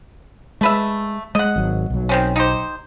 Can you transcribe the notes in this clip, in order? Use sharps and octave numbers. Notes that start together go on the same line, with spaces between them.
G#3 A3 B4 E5
G#3 D#5 F#5
G#1 F#3
B1 F#3
D#3 C4 C#4
D#4 G4 C5